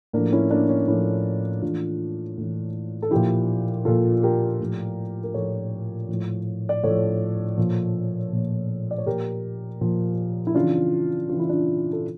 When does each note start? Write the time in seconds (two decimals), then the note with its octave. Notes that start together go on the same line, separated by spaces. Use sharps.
0.13 A2 F3 A#3 D4
0.32 C#4 E4
0.51 A#3 D4
0.69 C#4
0.88 A2 F3 C#4 E4
1.62 A2 E3 D4 F4
2.38 A2 E3
3.02 A4
3.11 A#2 F3 E4 G4
3.85 A#2 F3 F4 A4
4.23 G4 A#4
4.60 A2 F3
5.23 A#4
5.34 A2 F3 A4 C#5
6.09 A2 F3
6.69 D5
6.83 A2 F3 A4 C#5
7.58 A#2 F3
8.32 A#2 F3
8.91 D5
8.98 C#5
9.06 A#2 F3 G4 A#4
9.81 A#2 F3
10.47 E4
10.55 C#3 E3 D4 F4
11.30 C#3 E3 F4
11.39 E4
11.49 D4 F4
11.93 A4